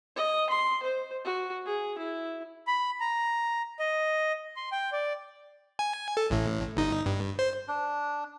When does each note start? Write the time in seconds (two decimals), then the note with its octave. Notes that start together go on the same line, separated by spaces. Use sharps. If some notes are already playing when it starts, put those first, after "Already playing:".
0.16 D#5
0.50 C6
0.83 C5
1.25 F#4
1.66 G#4
1.98 E4
2.67 B5
3.01 A#5
3.79 D#5
4.56 C6
4.72 G5
4.92 D5
5.79 G#5
6.17 A4
6.30 A1 A2
6.77 G1 D#4
7.06 G2
7.39 C5
7.68 D4